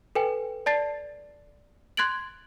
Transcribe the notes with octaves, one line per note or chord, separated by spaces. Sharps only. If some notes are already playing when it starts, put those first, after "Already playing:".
A4 B4 G5 G#5
D5 A5 A6 C7
C6 F#6 G#6 A6 D7 F#7